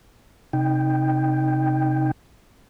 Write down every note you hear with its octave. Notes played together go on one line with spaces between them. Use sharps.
C3 D#4 G5